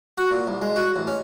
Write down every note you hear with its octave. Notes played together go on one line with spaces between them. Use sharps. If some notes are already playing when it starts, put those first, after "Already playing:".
F#4
A#2
C2
G#3
F#4
A1
C#4